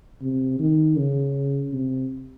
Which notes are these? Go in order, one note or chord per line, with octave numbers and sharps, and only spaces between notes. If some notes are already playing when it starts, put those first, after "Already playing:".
C3
D#3
C#3
C3